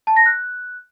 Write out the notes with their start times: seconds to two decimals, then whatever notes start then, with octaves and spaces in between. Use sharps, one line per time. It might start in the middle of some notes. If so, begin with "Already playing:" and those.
0.07 A5
0.16 A#6
0.26 F#6